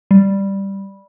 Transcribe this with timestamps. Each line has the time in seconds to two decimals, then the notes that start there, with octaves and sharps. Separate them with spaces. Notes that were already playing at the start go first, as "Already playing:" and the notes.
0.11 G3